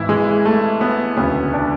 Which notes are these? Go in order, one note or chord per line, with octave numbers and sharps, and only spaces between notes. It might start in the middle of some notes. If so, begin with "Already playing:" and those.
Already playing: G#1 G#2 E3 E4
G#3
A3
B3
E1 D2 C#3 B3
D4